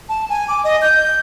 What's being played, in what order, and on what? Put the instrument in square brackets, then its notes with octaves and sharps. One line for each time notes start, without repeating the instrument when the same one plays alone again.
[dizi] A5
G#5
D6
D#5
G6